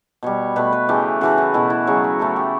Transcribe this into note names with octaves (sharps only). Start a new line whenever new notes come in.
B2 G3 C#5
B2 A3 B4
B4
C#3 E3 A3 G4
C#3 E3 A3 F#4
E4
B2 A3 E4
E4
C#3 F#3 A3 C#5
B4
C#3 E3 A3 A4
G4